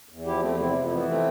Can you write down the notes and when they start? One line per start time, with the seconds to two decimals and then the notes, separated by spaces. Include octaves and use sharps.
0.09 E2
0.26 F3 E4 G4
0.42 E2 A3 C4
0.59 C3 C4 E4
0.75 F2
0.86 A3
0.91 E3 B3
1.08 A3 C4